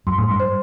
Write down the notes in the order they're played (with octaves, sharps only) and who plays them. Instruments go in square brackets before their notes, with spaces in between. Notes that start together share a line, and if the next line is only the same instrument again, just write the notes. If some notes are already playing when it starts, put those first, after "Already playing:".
[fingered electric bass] F#2 [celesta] C6
[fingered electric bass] A2
[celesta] C6
[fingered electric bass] G2
[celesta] C5